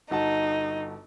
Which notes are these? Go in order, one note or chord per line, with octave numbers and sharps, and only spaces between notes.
G1 D#4 F#4 A5